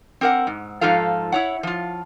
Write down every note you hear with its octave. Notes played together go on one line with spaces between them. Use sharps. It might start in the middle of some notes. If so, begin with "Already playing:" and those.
C4 A#4 F#5
G#2
G#2 F3 D#4 F4 A4 F5
E4 C#5 F#5
F3 F4